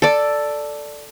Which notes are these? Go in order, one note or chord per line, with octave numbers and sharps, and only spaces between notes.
A4 D5